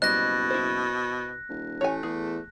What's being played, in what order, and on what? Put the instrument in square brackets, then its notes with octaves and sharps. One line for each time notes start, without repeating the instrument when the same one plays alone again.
[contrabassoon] F#1 [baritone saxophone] B2 [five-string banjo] G3 C5 D#5 [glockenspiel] F#6 A#6
[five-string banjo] E4 C5
[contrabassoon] D#1
[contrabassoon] A1 [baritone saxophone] A3 [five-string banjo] C#5 G#5
[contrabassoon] E2 [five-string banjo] G#4